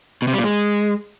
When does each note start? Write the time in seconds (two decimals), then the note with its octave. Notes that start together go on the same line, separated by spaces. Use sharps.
0.22 B2
0.28 C3
0.33 G3
0.38 A#2
0.44 G#3